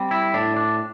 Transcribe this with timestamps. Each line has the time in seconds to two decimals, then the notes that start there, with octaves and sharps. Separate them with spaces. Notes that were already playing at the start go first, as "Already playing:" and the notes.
Already playing: G3 C4
0.11 E4
0.34 A2 D4
0.56 D4